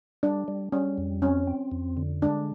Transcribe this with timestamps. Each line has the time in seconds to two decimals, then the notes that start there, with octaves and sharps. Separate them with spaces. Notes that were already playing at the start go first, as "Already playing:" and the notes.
0.23 G3 D4
0.48 G3
0.72 G3 C#4
0.98 F2
1.22 C4 C#4
1.47 C4
1.72 F2
1.97 D3
2.22 G#3 D4